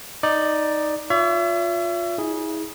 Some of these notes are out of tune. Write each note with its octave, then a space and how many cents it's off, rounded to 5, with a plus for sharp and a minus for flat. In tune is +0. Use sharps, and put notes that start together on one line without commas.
D#4 +0 D5 +10
F4 +15 C#5 +45 E5 +35
E4 -40 G#4 +0